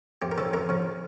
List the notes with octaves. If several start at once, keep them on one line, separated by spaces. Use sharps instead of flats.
F2 G4
A#4
C#3 F3 A4
F2 A#4
C#3 F3